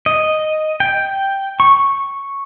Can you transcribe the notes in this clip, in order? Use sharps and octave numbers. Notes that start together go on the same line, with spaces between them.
D#5
G5
C#6